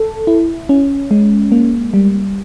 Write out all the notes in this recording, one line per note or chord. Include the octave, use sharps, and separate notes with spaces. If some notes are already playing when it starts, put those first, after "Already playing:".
Already playing: A4
E4
C#4
G#3
A#3
G3